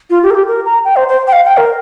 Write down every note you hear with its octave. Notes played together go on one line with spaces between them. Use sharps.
F4
G4
A#4
G4
A#4
A#5
G5
C5
C5
G5
F5
G5
A#4